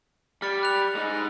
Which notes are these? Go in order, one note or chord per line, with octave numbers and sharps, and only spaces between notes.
G3 F6 A6 C#7
F#6 F7
G#3 D#4